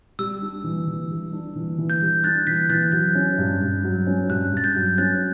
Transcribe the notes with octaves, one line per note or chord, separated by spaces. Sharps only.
G3 E6
D4
E3
E3
G3
D4
E3
E3
G6
G3
D4 F#6 A6
E3 G6 B6
E3 F#6 A6
F#3 G6
C#4
G2
G2
F#3
C#4
G2 F#6
G2 A6
G6
F#3
C#4 F#6 A6